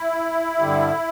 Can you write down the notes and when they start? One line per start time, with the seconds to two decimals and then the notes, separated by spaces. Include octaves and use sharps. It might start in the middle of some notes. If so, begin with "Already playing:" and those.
Already playing: E4
0.58 G2 D3 G3